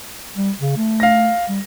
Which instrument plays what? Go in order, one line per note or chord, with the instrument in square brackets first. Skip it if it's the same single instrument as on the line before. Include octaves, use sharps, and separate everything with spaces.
[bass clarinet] G3
C#3
A3
[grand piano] F5 A#6
[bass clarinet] G3